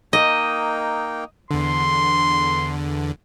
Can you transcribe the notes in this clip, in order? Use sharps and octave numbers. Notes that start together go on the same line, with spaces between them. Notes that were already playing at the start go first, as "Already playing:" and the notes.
A#3 D#4 D#5 G5
E2 D3 C6